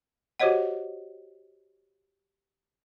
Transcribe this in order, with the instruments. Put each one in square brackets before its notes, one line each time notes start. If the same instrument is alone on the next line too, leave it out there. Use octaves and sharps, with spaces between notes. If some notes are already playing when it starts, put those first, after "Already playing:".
[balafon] F#4 G4 C5 C#5 D#5 F#5